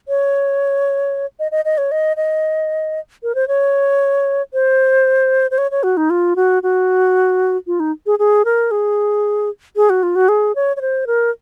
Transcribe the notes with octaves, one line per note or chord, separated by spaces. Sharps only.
C#5
D#5
D#5
D#5
C#5
D#5
D#5
A#4
C5
C#5
C5
C5
C#5
C#5
F#4
D#4
F4
F#4
F#4
F4
D#4
G#4
G#4
A#4
G#4
G#4
F#4
F4
F#4
G#4
C#5
C#5
C5
A#4